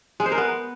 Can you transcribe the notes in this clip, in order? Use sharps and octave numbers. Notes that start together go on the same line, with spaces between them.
G#3
C5
A#4
B3